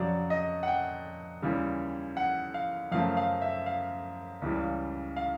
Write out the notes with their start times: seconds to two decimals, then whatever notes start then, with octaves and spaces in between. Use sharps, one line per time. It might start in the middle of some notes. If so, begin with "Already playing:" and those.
Already playing: F2 C#3 F#3 D5
0.30 D#5
0.63 F#5
0.68 G5
1.42 D#2 C#3 E3 G3
2.17 F#5
2.54 F5
2.91 F#2 C#3 F3 A3 F5
3.17 F5
3.42 E5
3.66 F5
4.42 C#2 C#3 E3 G3
5.16 F5